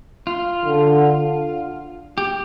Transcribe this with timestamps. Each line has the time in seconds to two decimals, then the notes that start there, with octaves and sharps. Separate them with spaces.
0.27 F4
0.65 D3
2.18 G4